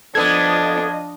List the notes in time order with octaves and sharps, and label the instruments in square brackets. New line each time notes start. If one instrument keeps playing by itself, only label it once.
[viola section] F3 D#5 [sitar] B3 A4 [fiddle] D4 [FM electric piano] G#6